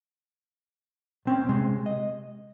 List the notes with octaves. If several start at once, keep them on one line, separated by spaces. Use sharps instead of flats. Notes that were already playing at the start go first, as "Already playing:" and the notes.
B1 C4 C#4
C3 G#3
D#5